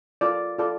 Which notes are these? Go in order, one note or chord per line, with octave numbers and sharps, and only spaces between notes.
F4 A4 D5
F4 A4 D5